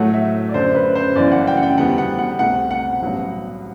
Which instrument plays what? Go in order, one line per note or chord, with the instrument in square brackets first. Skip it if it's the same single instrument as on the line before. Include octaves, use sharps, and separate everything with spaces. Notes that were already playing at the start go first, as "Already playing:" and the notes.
Already playing: [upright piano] A2 F#3 A3 [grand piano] F#5
[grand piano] E5
D5
[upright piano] F#2 D3 F#3 [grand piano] C5
[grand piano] B4
C5
[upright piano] G1 F#2 E3 [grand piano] D5
[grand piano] F#5
G5
F#5
G5
[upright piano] E2 D3 G3 B3 [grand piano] F#5
[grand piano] F#5
F#5
[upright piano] C2 B2 A3 [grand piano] F#5
[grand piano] F#5
[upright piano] A1 G2 F#3 B3